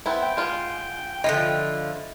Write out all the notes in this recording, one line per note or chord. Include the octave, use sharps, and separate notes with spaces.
B3 C4 E4
G5
G#3 F4
D3 F3 E4 F4 D#5